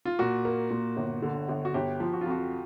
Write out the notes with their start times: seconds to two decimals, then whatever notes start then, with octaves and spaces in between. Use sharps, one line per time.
0.05 F4
0.19 A#2 F#4
0.45 A#3
0.71 A#2
0.97 G1
1.22 D3
1.49 G1
1.65 F#4
1.74 G1 G4
2.00 F3
2.13 F#4
2.21 F4
2.26 F2 F#4